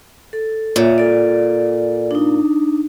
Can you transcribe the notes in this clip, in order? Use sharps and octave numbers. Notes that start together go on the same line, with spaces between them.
A4
A#2 C#5 E5
A4 D5
D4 D#4